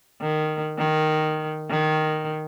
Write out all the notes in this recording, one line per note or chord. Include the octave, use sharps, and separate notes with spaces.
D#3
D#3
D#3